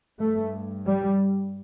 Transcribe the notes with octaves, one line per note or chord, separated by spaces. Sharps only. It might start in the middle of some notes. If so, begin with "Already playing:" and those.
G2 A3
G3